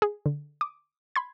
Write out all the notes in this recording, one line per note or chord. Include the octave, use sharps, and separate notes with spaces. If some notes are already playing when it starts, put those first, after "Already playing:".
G#4
D3
D6 D#6
B5 C6 G#6